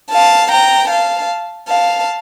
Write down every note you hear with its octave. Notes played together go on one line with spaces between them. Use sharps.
F5 A5
G5 A#5
F5 A5
F5 A5